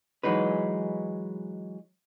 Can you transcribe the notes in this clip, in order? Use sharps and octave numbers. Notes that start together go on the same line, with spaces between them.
E3 F#3 G#3 D#4 B4